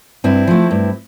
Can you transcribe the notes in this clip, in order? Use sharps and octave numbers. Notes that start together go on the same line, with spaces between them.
G2 C4 E4
F3 A3
G2